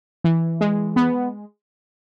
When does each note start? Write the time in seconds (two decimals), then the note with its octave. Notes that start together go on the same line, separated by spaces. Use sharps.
0.24 E3
0.61 G#3
0.96 B3